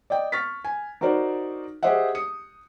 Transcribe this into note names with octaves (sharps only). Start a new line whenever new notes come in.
D5 D#5 G5
C#6 F6 A6 B6
G#5
D#4 F#4 A#4 C5 D5
G4 G#4 C5 D#5 E5 F#5
D#6 C#7